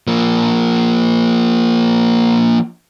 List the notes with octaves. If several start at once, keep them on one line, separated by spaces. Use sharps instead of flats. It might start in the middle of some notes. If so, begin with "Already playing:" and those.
F3 A#3